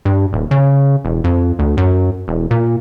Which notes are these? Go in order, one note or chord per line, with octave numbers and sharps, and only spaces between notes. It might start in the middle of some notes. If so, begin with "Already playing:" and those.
G2
D#1
C#3
E1
F2
D2
F#2
E1
A#2